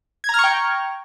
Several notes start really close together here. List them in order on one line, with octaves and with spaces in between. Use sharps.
G#6 A#5 F6 C#6 G5